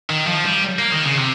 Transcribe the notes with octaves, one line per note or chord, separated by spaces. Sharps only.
D#3
F3
G3
A#3
D#3
C#3
C3